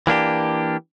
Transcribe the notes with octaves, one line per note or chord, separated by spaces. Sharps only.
E3 A#3 D4 G4